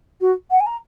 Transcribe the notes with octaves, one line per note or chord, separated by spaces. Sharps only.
F#4
F#5
G#5
A#5